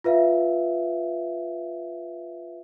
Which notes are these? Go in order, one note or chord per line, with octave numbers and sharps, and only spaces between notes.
F4 B4 E5 F5